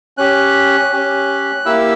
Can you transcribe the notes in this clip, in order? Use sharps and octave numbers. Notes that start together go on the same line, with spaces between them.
C#4 G4 F#6
C#4 G4
A#3 E4 G4 E6